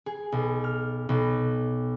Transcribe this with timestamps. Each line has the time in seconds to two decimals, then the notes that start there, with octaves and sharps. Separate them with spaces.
0.06 G#4
0.32 B1
0.64 F6
1.09 B1